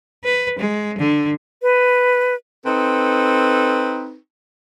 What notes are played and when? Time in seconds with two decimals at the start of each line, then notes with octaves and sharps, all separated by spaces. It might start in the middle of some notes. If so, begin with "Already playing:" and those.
0.24 B4
0.59 G#3
0.98 D3
1.62 B4
2.66 C4 D#4 A4 B4